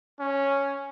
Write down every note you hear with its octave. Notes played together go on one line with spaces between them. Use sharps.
C#4